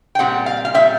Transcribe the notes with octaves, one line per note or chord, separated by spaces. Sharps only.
G5
A#2 G3 C4 F#5
F5
F5
A#2 G3 C4 E5